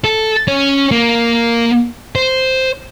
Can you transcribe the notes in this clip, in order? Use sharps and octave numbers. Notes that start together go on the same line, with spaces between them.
A4
C#4
A#3
C5